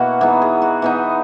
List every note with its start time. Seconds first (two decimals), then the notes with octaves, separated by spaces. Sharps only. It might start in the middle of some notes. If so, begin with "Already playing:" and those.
Already playing: B2 A#3 E4 F#4
0.21 E3 B3 D#4 G#4
0.42 G#4
0.62 F#4
0.82 E3 B3 D#4